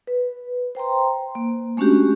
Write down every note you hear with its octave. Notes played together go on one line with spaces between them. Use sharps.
B4
C5 G5 A#5 C6
A#3
G#3 A3 C#4 D4 F#4 G4